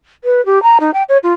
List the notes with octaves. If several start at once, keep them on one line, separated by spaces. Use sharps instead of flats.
B4
G4
A#5
D#4
G5
C#5
F4